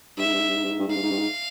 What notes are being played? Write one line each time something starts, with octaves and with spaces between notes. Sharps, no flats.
G2 E5
G#2
G2
G#2
G2
G#2
G2
G#2
G2
G#2 F5
G2
G#2
G2
G#2